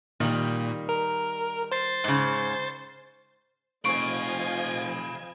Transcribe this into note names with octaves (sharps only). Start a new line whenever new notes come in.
A#2 D#3 G3
A#4
C5 A6 C7
G#2 C#3
F1 F3 D#5 F5 G#5 B5 C#6 D7